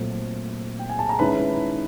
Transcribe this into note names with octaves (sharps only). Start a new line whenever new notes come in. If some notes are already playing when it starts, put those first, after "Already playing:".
Already playing: A#2 F#3 A3 C4
G5
G#5
A5
A#5
D#3 G#3 C#4 E4 B4 B5